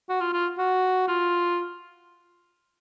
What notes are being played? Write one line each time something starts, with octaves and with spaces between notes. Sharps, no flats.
F#4
F4
F4
F#4
F4